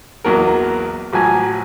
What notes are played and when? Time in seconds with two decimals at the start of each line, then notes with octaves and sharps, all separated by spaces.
0.24 A#1 E2 F#3 A#4
1.13 A1 F3 F#3 G#5